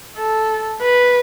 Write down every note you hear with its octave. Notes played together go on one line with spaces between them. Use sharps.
A4
B4